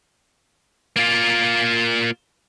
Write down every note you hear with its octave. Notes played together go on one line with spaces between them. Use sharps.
A#3 F4